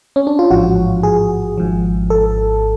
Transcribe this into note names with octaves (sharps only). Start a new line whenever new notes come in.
C#4
D4
F4
A1 G#2 F3 F#4
G#4
G#1 G#2 F3
A4